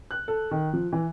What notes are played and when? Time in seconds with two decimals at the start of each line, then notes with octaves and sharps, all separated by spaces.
0.11 F#6
0.28 A4
0.51 D#3
0.73 F3
0.93 E3